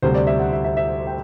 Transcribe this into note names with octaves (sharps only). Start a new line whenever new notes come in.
D2 C3 G3 C5
D5
E5
F#5
E5
E5
E5
G5